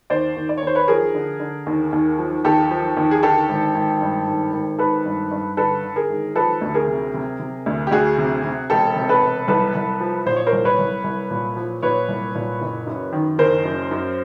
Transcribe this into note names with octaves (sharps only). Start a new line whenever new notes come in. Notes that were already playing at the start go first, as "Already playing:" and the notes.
D#2 C5 D5
D#2
D5
C#5
D#2 C5
B4 C#5
F3 G#4 A#4
D3
D3
D#2
D#2
F3
D#2 G4 A4
F3
D#2
G#4
D3 G4 A4
G#1
G#1
G2
G#1
G#1
G#1 A4 B4
G2
G2
D3 A4 B4
D3
G#4 A#4
G#1
F3 A4 B4
D2
G#4 A#4
C3
C3
C3
D2
G4
D2 F#4 G#4
C3
C3
E1 G4 A4
C3
A4 B4
E1
C2 A4 B4
C2
F3
A#2 C5
C#5
A#4 C5
C2
B4 C#5
C2
C2
A#2
F3
A#2 B4 C#5
C2
A#2
F#1
F#2
D#3
F#1 A#4 C5
F#2
F#2